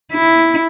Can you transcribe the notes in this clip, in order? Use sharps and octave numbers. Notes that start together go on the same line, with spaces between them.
E4